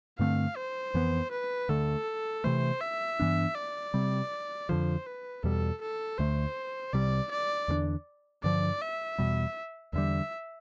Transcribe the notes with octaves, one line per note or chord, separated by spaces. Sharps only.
G2 D3 A3 C4 F5
C5
F2 E3 B3
B4
D2 D3 A3 A4
C3 E3 A3 C5
E5
G2 E3 B3 D4
D5
C3 G3 C4
F2 D3 F3 C5
B4
E2 B2 G3 A4
A4
D2 D3 A3 C5
C2 C3 G3 D5
D5
E2 D3 G3 D4
G2 D3 F3 D5
E5
E2 B2 G3
E2 D3 G3 E5